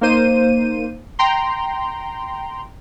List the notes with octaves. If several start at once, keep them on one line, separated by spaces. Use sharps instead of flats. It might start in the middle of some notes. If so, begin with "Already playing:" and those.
A#3 D#4 C5 D#7
G5 A#5 C6